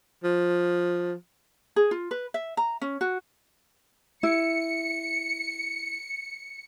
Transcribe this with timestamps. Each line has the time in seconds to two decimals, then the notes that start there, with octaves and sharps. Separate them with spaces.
0.24 F3
1.76 G#4
1.91 F4
2.11 B4
2.34 E5
2.57 A#5
2.81 C#4
3.01 F#4
4.23 E4 C#7